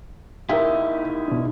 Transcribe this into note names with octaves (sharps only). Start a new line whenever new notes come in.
D#4 E4 G4 A#4 E5 F5
B2 D4